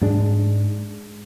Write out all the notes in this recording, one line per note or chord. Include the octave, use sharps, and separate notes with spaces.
G#2 G#3 D4